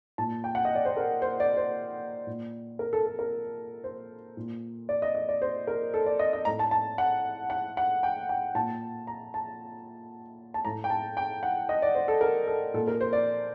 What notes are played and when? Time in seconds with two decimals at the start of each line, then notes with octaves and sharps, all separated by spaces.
0.18 A#2 A5
0.44 G5
0.55 F#5
0.65 D#5
0.75 D5
0.85 C5
0.97 A#4
1.22 C5
1.40 D5
1.57 C5
2.27 A#2
2.79 A#4
2.93 A4
3.06 A4
3.19 A#4
3.84 C5
4.37 A#2
4.89 D5
5.02 D#5
5.15 D#5
5.29 D5
5.42 C5
5.67 A#4
5.94 A4
6.06 D5
6.19 D#5
6.33 D#5
6.45 A2 A#5
6.59 A5
6.71 A5
6.98 F#5
7.50 F#5
7.77 F#5
8.03 G5
8.29 G5
8.55 A#2 A5
9.07 A#5
9.34 A5
10.54 A5
10.65 A2 A#5
10.84 G5
10.90 A5
11.17 G5
11.43 F#5
11.69 D#5
11.82 D5
11.95 C5
12.08 A4
12.21 A#4
12.47 A4
12.74 A#2 A4
12.88 A#4
13.01 C5
13.13 D5